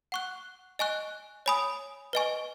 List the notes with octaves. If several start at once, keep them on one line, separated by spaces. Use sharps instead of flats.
F#5 C#6 F#6
D#5 G#5 C#6 F#6
C#5 G#5 B5 D#6
B4 D#5 G#5 C#6